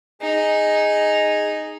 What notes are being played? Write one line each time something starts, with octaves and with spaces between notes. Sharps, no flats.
D#4 G#4 G#5